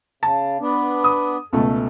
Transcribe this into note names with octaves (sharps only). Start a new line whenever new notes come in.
C#3 A5
B3 D4
D#6
C#2 B2 A3 A4